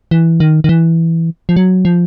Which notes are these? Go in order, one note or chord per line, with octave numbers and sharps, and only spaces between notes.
E3
D#3
D#3
E3
F3
F#3
F3